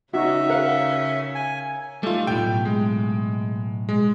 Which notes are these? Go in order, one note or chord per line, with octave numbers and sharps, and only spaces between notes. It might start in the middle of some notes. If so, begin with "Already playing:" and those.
C#3 C#4 D#4 F#4 E5
A#4 F5 F#5
G#5
G3 A3 D#4 F4
B1 A2 G5
G#3
G#3